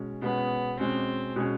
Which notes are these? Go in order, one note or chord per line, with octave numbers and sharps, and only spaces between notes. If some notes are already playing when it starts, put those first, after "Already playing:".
Already playing: B2 G#3 C#4
B2 G#3 B3 C#4
B2 G#3 C4 C#4
B2 G#3 C#4